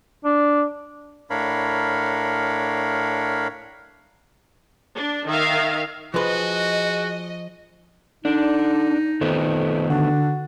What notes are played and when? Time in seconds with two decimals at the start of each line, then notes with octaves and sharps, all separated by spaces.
0.25 D4
1.30 A2 D4 A#4 C#5 F5 B5
4.96 D4
5.27 D#3 E5 F5
6.14 F3 F#4 G#4 B4 D#5
8.25 D3 D4 D#4
9.21 F2 D#3 A3 B3
9.90 D3 D4 F#4